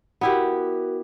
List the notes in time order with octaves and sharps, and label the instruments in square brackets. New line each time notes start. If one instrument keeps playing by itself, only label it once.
[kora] B3 E4 G4 [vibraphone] F#4 A#4